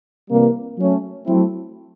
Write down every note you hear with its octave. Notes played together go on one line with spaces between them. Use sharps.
C3 E3 G3 A#3
F#3 A3 C#4
F#3 A3 C4 E4